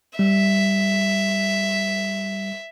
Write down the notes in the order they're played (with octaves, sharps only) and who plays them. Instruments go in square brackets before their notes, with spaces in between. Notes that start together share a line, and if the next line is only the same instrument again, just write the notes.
[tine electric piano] G3 [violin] E5